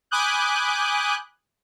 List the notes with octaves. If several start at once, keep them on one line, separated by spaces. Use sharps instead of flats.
G#5 B5 D6 D#6 F#6 G6